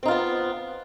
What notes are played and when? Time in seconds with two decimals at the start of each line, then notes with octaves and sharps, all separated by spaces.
0.03 C4
0.05 D#4
0.08 F4
0.11 B3